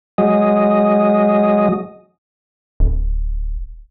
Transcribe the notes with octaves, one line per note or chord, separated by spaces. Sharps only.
F#3 G#3 D#5
D1